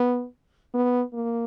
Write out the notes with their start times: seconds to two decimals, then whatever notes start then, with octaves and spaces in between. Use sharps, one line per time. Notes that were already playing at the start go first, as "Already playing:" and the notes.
Already playing: B3
0.74 B3
1.15 A#3